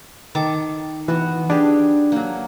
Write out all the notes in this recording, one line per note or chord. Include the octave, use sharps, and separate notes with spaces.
D#3 A4 D6
E3 B3 F#4
D4 G4 G#4
F#3 A#3